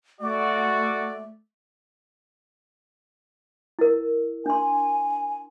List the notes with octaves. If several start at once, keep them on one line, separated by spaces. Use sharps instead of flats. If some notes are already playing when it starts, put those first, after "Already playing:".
A3 F#4 D5
E4 A#4
D4 G#5 C6